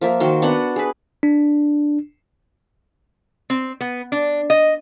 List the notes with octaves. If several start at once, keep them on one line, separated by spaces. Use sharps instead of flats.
F3 A#3 E5
D#3 F#4 C5 G5
B3 D4 F#5
G#4 B4
D4
C4
B3
D4
D#5